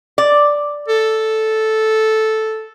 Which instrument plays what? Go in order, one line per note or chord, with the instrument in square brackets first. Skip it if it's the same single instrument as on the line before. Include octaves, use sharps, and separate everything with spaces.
[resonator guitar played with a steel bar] D5
[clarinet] A4